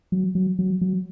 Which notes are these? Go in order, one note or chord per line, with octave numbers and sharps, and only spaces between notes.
F#3
F#3
F#3
F#3